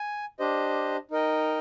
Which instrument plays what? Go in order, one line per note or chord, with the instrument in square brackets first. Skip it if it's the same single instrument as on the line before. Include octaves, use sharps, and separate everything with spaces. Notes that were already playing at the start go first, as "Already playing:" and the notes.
Already playing: [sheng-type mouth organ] G#5
D4 G4 C5 D#5
D#4 A#4 D#5 G5